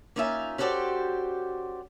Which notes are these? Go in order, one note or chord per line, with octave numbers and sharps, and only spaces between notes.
A#3 C#4 D#4 F4 E5 G#5
C#4 F#4 G4 A4 C5 D5